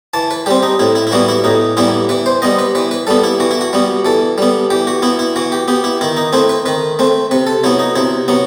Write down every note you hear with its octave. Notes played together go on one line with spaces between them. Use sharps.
E3 A5
B4
G3 C4 G4
D#4
A2 E4
E4
E4
E3 G3 B3 F#4
E4
A2 D#4
E3 G3 B3 E4
E3 B4
C5
G3 B3 D#5
B4
E3 B4
B4
G3 B3 A4
E4
E3 F#4
E4
F#4
G3 B3
E3 A4
G3 B3
E3 G4
F#4
B3 E4
E4
E3 F#4
G4
B3 G4
E4
D#3 E4
D#4
A3 C4 E4
B4
D#3 B4
A3 C4
C3 B4
A4
F#3 B3 E4
D#4
C3 E4
F#3 B3